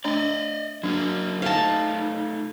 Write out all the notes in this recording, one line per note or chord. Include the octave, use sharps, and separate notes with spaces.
A3 D4 D5 D#5 A#5
F#3 A#3 D4 F#4
A3 D#4 F5 A5